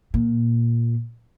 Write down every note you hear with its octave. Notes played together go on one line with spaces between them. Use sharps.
A#2